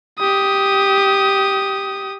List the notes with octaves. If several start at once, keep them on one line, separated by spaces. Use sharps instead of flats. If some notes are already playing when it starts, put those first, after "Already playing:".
G4 D#6